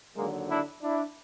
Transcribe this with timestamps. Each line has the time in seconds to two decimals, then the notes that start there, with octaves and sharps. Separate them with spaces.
0.15 D#2 D3 F#3 G#3 A#3
0.50 D4 E4
0.82 D4 E4